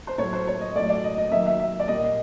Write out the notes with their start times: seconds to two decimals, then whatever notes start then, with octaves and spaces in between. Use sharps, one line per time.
0.07 C5
0.18 A2 F#3 A3 C#5
0.33 C5
0.47 C#5
0.61 D#5
0.75 A2 F#3 A3 D5
0.89 D5
1.04 D#5
1.18 D#5
1.32 D#3 F#3 A#3 E5
1.46 E5
1.59 E5
1.80 D5
1.88 A#2 G3 A#3 D#5